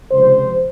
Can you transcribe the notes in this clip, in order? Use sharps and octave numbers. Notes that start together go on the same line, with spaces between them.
C#2 C3 F3 C5